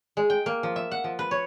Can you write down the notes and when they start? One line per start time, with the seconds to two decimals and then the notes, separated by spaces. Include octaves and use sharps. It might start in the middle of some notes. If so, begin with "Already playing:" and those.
0.17 G#3
0.30 G5
0.46 A#3
0.63 F3
0.76 E5
0.91 F#5
1.04 F3
1.19 B4
1.31 C#5